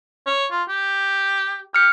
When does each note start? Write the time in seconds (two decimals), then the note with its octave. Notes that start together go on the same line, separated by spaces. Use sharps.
0.27 C#5
0.51 F4
0.68 G4
1.74 G4 F6 C#7